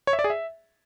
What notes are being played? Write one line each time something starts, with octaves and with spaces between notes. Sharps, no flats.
C#5
E5
D5
G#4
E5